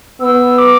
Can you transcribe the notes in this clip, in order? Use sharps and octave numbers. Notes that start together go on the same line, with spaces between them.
B3 E6
D6